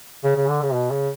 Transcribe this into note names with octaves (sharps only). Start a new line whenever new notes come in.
C#3
C#3
D3
C#3
B2
C#3